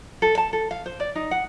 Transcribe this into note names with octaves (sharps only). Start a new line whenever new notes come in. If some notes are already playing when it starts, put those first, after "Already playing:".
A4
A5
A4
F5
C5
D5
D#4
F#5